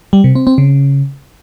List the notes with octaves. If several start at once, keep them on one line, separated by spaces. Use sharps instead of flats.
G3
C3
C4
C4
C#3